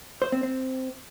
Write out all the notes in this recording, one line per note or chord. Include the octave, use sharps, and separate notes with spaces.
C5
C4
C4